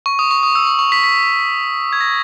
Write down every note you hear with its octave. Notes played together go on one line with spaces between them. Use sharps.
C#6
D#6
C#6
D#6
E6
C#6
C#6
B6
B6
G#6
A#6